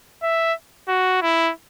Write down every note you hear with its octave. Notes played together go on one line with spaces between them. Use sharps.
E5
F#4
E4